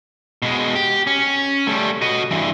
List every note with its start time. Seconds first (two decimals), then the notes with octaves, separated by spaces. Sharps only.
0.42 B2 G#3
0.75 G4
1.07 C#4
1.67 G3 A3
2.02 F#4 D#5
2.31 G2 E3